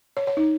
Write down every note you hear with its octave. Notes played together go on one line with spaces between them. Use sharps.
C#5
C#5
D#4